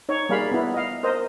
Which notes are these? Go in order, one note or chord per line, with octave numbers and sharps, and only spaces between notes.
D#4 C#5
G3 A#3 G#4 D5 F5 B5
B3 E4
D#5 F5
A#4 C5 D#5